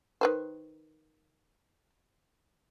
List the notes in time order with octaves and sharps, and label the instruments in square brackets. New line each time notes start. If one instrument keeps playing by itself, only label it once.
[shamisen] D#3 B4 C5